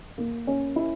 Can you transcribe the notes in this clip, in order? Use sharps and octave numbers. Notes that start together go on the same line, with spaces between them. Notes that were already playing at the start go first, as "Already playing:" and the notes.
A#3
C#4
E4